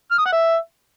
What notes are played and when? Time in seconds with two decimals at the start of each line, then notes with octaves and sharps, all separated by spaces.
0.11 F6
0.18 D#6
0.25 F#5
0.32 E5